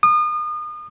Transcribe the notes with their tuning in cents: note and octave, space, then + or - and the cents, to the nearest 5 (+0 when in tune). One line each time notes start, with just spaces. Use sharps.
D#6 -35